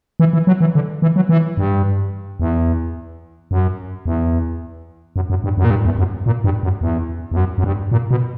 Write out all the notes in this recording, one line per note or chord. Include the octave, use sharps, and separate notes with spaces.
E3
E3
F#3
E3
D3
E3
F#3
E3
G2
E2
F#2
E2
F#2
F#2
G2
F#2
A#2
G2
E2
F#2
A#2
G2
F#2
E2
E2
F#2
F#2
G2
A#2
B2